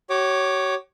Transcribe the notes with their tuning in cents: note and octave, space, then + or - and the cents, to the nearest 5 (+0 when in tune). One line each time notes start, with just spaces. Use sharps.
F#4 +45 C#5 +0 D6 +15